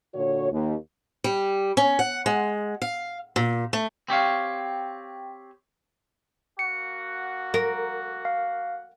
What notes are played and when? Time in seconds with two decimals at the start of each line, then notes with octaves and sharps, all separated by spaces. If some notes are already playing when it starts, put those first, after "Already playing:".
0.14 A#2 D3 F#4 C#5
0.51 D#2
1.24 G3
1.77 C#4
1.99 F#5
2.26 G#3
2.82 F5
3.36 A#2
3.73 A3
4.08 C4 G4 C#5 F5
6.59 A#3 F#4 F#5 C#7
7.54 A#4
8.25 F5